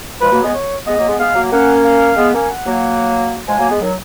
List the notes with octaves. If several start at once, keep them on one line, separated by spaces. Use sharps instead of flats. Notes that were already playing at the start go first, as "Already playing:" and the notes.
F3 G#3 B4
F#3 A#3
G#3 B3
C#5
G#3 B3 D#5
F#3 A#3
G#3 B3
G#3 B3 F5
F#3 A#3
A#3 C#4 F#5
F5
G#3 B3
A#3 C#4
F#5
F#3 A#3
F3 G#3 G#5
F#3 A#3
G#3 B3
D#3 F#3